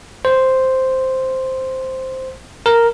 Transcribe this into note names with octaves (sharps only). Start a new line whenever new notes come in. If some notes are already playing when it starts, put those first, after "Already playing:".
C5
A#4